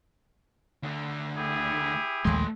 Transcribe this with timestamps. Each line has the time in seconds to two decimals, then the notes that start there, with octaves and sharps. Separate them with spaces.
0.83 D2 D3
1.37 E4 G4 G#4
2.25 A#1 D#2 G#3 A3 C6